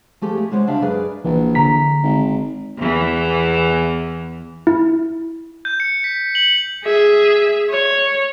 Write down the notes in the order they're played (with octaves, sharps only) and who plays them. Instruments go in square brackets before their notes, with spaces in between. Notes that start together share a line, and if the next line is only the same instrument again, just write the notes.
[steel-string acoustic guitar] F3 A3 G4 G#4
E4
G#3 B3 C5 C#5
C#3 D4 F#4 E5 F5
F#2 G#4 B4 D5
[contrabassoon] A#1 [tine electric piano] E3
[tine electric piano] D3 A#5 B6
[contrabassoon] G#1
[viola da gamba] E2 E3
[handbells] E4
[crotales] G6
C#7
B6
F#7
[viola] G#4 E5
C#5